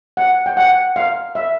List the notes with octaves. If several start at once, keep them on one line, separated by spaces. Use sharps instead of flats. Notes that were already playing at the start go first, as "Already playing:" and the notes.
F#5
G5
F#5
F5
E5